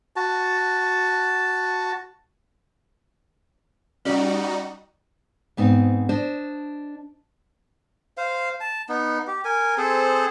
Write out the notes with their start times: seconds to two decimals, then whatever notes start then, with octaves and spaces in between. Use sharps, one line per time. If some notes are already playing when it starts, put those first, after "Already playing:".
0.16 F#4 A5
4.05 G3 C#4 D#4 F#4 D5
5.57 G#2 B3 C4 D#4
6.09 D4 C5 D#5
8.17 C5 F5
8.60 A5
8.89 B3 D#4
9.27 G4
9.45 A#4 G#5
9.78 C4 G#4 A4 C5